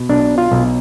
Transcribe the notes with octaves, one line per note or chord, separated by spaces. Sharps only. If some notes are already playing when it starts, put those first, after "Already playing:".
Already playing: B2
B1 D4
F4
B1